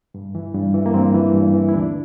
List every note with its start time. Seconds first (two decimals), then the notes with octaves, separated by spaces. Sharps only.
0.14 G2
0.35 E3
0.55 G2
0.74 E3
0.86 A#3
0.94 G2 C4
1.14 E3
1.34 G2
1.54 E3
1.69 E4
1.74 D2 D4